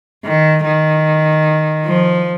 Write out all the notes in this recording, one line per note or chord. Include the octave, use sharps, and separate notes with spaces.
D#3
D#3
F3